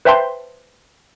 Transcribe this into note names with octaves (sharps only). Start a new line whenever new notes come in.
B4 C5 E5 G5 A5 C6